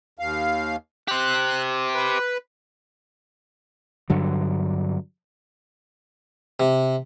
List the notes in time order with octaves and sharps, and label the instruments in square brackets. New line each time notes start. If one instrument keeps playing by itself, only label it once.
[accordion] D#2 F5
[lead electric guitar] G4 C5 [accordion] F#6
[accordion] B4
[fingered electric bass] G2 D3 F#3
[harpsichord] C3